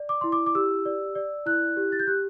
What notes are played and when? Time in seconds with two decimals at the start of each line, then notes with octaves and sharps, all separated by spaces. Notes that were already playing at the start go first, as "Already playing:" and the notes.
Already playing: D5
0.09 D6
0.21 E4 C6
0.32 D6
0.46 D6
0.55 G4 E6
0.85 D5
1.15 D5
1.46 E4 F#6
1.77 G4
1.92 A6
1.99 G6
2.07 G4 F#6